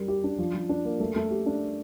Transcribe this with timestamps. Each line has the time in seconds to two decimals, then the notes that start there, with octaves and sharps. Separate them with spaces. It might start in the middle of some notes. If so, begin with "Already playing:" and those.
Already playing: G3 A#4
0.08 G4
0.24 D4
0.39 F3
0.54 F3
0.69 D4
0.85 A#3
1.00 A3
1.16 A3
1.31 G4
1.46 D4